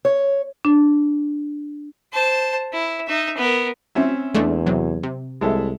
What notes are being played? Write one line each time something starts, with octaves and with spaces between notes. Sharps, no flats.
C#5
D4
C5 A5
E4
D#4 E5
B3 A#4
C4 C#4 E5
E2 G#3 A3 D4
C3 F#3
C3
C2 G#3 A4 E5